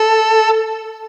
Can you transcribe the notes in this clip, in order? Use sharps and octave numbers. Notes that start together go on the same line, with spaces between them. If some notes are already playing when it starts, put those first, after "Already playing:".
Already playing: A4